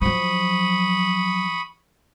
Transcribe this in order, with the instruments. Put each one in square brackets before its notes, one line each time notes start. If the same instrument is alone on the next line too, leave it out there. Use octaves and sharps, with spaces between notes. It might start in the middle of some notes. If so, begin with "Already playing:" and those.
[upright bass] F3 F#3 [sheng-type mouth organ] B5 C#6 D#6